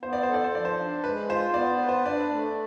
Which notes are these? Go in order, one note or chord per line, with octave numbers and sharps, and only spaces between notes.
B3 C5
D5
A4 C5
D5
C5
F3 D5
C5
D4
G#3 B4
F4 C5
B3 D5
B4
C5
D4 D5
A3